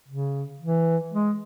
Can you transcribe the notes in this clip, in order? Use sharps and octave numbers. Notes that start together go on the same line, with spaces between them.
C#3
E3
G#3